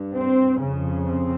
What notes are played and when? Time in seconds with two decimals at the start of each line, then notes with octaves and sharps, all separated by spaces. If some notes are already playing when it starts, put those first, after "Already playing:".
Already playing: G2
0.15 C4
0.61 F2 C#3
1.06 C4